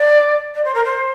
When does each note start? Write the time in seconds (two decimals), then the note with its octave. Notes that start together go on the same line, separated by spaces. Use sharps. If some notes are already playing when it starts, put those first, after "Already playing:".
Already playing: D5
0.54 D5
0.64 C5
0.74 A#4
0.84 C5